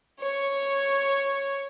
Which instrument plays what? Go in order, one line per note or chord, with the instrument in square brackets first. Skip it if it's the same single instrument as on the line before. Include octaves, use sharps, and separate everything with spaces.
[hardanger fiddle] C#5 C#6